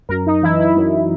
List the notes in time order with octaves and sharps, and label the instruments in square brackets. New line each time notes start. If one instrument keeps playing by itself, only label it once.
[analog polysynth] F#2 A#4
D#4
E3 E4
E4
F#2